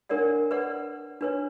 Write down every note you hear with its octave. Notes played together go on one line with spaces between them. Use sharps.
D4 A#4 C#5 D5 F#5
B4 D5 F#5
D4 B4 C#5